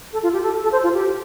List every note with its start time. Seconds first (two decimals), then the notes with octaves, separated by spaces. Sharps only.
0.13 A4
0.23 F4
0.33 G4
0.43 A4
0.63 A4
0.72 C5
0.83 F4
0.93 G4